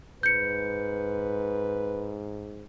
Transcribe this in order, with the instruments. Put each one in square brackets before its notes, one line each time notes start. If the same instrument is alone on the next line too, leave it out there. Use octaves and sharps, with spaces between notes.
[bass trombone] G#2 [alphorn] B4 [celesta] G6 C#7